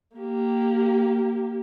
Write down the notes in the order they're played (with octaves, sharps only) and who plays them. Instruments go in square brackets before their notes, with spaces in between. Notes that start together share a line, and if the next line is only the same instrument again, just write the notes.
[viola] A#3 G4